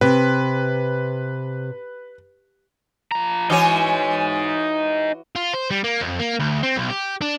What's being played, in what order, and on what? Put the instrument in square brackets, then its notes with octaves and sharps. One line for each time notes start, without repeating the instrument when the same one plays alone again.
[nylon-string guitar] C3 [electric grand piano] B4
[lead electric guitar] F3 A#5
[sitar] E3 F#4 C#5 [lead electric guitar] D#4 G#5
[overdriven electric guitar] F4
C5
G3
A#3
F2
A#3
D2
C4
B1
G4
D4